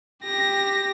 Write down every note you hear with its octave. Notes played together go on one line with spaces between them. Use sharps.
G4 A#6